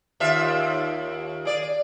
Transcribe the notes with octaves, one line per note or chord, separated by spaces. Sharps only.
D#2 F4 E5
G#4 D5